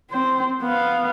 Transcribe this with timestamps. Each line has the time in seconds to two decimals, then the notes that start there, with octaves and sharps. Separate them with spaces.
0.10 C4 C5
0.62 B3 F5